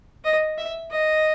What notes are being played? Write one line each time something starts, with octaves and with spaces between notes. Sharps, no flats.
D#5
E5
D#5